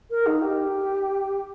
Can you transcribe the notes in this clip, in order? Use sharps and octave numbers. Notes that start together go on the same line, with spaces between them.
A#4
D#4
G4